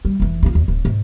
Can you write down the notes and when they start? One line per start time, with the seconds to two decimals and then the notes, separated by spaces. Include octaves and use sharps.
0.05 G3
0.20 F1 E3
0.43 D3 F4
0.55 D#2
0.68 D1
0.85 G#2